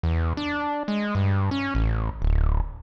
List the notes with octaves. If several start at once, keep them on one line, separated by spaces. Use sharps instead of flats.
E2
D4
G#3
G2
C#4
A1
D1